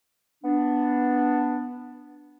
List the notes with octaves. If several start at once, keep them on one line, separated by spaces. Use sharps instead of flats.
B3 D4